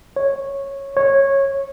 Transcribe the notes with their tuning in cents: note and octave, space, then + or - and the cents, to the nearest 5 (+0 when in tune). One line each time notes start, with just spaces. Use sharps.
C#5 -10
C#5 -15